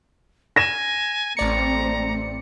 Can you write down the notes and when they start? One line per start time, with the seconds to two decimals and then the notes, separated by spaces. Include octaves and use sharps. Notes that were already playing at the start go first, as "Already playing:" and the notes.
0.56 G#5 A#6 E7
1.37 A1 A3 C4 D5 A#5 C#7